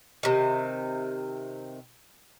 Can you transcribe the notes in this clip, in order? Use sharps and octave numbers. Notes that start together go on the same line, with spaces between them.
C3 D#3